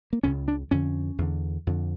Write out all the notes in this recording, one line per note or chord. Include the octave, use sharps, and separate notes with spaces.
A#3
C#2 C#3 C#4
D4
F2 D3 C#4
E2 D3
F2 D3